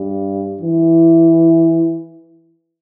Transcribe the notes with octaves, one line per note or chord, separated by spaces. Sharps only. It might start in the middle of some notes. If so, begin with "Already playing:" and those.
Already playing: G2
E3